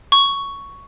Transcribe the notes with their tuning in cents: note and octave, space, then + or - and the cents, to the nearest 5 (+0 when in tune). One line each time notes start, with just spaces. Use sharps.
C#6 +5